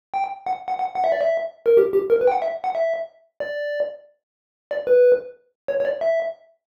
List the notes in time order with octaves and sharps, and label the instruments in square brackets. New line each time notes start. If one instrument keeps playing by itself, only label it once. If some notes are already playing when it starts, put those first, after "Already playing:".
[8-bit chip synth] G5
F#5
F#5
F#5
F#5
E5
D5
E5
A#4
G4
G4
A#4
B4
G5
F#5
E5
F#5
E5
D5
D5
B4
C#5
C#5
D5
E5